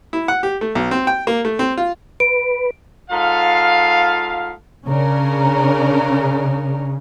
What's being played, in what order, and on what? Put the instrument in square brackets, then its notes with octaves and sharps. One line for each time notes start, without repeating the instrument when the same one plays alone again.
[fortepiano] E4
F#5
G4
A3
B1
C4
G5
A#3
A3
C4
F4
[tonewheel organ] B4 [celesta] D7
[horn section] G#2 F4 A4 F5
[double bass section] C#3 [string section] C#4 D4 A#4